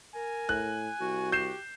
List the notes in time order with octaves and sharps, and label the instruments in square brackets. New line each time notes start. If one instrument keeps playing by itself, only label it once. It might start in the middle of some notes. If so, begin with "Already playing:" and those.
[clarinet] A#4 [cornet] G#5
[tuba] A2 [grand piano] F#6
[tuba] C2 [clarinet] F#4
[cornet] G4 [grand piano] G6 C7 E7